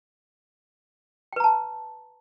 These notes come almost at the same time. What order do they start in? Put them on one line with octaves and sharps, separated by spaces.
G5 B4 A#5 A5